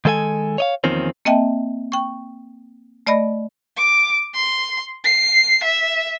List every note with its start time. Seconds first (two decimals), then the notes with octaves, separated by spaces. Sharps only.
0.05 D#3 G#3 A4 F5 G#5
0.58 C#5 D#5 F5
0.84 E2 D#3 F3 A#3 C4 C#4
1.25 A#3 C4 D#5 E5 G5 A5
1.92 G5 C#6
3.06 A3 D5 D#5 B5 A#6
3.77 D6
4.35 C6
5.05 C7
5.64 E5